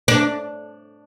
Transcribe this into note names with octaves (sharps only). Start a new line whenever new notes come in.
D4